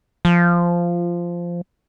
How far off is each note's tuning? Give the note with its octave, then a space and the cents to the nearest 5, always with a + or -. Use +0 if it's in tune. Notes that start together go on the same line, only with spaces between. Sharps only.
F3 -10